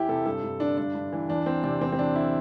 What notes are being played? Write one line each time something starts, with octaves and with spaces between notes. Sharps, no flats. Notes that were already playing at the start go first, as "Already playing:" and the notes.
Already playing: E2 E3 E4 G4
C3 A4
G2 A4
G2
D3 D4
G2 D4
G2
E3
E2 D4
E3 C4
C3 D4
E2 C4
C4
E2 D4
D3 E4